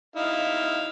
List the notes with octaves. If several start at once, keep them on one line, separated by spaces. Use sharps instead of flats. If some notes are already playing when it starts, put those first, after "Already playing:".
D#4 E4 F5